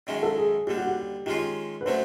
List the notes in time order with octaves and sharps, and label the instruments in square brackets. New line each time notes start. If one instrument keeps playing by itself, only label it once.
[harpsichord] F#2 D#3 G#3 C#4
[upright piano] A4
G#4
[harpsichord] D#2 D3 G3 [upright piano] G4
[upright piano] F#4
G4
[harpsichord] D#3 G#3 C#4 F4 [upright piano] G4
[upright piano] B4
[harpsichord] D3 F#3 A3 C#4 [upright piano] C5